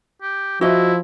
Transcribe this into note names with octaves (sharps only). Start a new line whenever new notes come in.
G4
F3 E4 F#4 D#5 E5